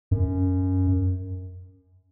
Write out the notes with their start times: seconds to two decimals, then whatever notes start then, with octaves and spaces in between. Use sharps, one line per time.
0.11 F#2